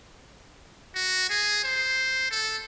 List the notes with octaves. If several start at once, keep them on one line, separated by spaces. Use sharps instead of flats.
F#4
G#4
C5
A4